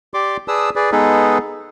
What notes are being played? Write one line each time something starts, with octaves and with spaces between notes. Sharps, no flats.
G4 D5 C6 D6
G#4 B4 D5 A5 D#6 E6
G#4 B4 D5
G#3 B3 D#4 G#4 A4 B4